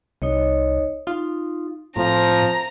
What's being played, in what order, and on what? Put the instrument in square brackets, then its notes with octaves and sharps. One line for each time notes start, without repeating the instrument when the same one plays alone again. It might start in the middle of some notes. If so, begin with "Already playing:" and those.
[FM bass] C2 [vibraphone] D#4 C#5 D#5
[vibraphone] D#4 [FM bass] F4
[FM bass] A2 [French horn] F3 [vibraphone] C4 [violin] A#5